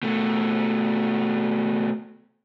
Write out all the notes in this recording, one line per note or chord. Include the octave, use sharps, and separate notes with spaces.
B2 A3